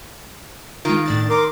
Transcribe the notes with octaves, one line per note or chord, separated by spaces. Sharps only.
D#3 G#3 F4
A2 D4 A6
A#4 C6 D6